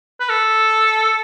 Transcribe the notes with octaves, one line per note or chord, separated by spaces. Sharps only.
B4
A4